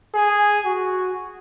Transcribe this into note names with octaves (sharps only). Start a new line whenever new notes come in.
G#4
F#4